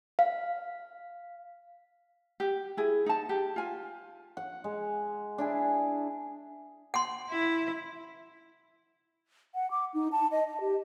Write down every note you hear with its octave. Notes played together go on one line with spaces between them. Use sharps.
F5
G4
E4 G#4
D#4 A5
G4
F4 G#5
F#5
G#3
D4 E4 G#4
F#5 C6
E4
F#5
D6
D#4
A5
D#5
D#5
G4